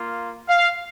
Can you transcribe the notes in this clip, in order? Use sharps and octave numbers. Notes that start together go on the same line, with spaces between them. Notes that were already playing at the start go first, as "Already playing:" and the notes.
Already playing: A#3 F4
F5